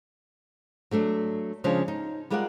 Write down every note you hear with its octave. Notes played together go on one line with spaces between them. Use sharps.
F#3 A3 D4 E5
C#3 F3 G#3 C#4 D4
D#4
G3 G#3 F4 A#4 D5 F#5